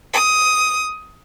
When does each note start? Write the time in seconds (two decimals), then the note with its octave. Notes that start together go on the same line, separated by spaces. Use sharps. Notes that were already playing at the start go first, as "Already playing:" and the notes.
0.13 D#6